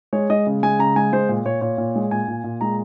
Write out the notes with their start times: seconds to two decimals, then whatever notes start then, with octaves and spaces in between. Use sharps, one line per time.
0.13 G#3 C#5
0.30 G#3 D#5
0.47 C#3
0.63 G#3 G#5
0.79 C#3 A#5
0.96 G#3 G#5
1.13 G#3 C5
1.29 A#2
1.45 A#2 C#5
1.61 A#2 C#5
1.78 A#2
1.95 G#3
2.11 A#2 G#5
2.28 A#2
2.44 A#2
2.61 G#3 A#5